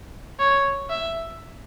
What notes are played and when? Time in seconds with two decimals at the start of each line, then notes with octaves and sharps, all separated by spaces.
0.39 C#5
0.90 E5